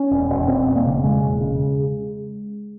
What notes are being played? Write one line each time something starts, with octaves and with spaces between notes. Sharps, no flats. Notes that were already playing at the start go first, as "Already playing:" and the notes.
Already playing: C#4
E1
E1
E1 C4
E1
A#3
C#3
E1 G#3
E1
C#3